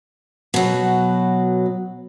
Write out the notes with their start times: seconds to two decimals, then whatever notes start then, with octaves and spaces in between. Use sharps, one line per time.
0.54 B2 F#3